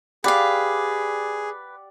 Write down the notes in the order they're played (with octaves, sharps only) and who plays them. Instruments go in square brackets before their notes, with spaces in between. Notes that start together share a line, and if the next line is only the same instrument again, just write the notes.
[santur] G4 D5 F#5 [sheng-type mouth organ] G#4 [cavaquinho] B4 F5